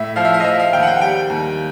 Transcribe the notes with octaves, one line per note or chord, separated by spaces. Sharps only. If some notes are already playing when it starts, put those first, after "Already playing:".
Already playing: A2 E5
F3 F5
E5
F5
D#5
F3 E5
F5
D#2 G5
F#5
G5
G3 G5
D#2